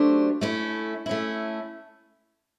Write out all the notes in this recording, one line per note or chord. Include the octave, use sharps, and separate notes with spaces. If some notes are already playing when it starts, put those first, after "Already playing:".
Already playing: F#3 A3 D4 G4 C5
A3 C#4 E4
A3 C#4 E4